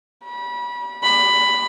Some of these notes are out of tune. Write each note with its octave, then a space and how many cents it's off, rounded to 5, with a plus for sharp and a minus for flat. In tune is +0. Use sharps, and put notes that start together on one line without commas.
B5 -30
B5 +10